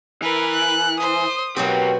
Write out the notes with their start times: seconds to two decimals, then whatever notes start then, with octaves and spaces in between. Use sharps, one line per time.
0.22 E3 A#4 B4
0.53 F#6
1.00 C5 D#6
1.56 B2 F#3 A#3 C4 F#4 G4